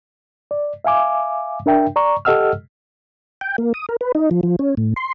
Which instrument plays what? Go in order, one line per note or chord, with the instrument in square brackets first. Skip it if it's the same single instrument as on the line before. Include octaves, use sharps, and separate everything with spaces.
[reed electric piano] D5
E5 F5 G#5 D6
D4 A#4 E5 G5
D5 A#5 C#6
G4 A4 D#5 F#5 E6 F6
[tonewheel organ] G5
A#3
D#6
A#4
B4
D#4
F3
F3
C#4
A2
C6